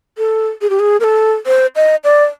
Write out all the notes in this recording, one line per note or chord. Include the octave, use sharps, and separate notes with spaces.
A4
G#4
G4
G#4
A#4
A4
C5
D#5
D5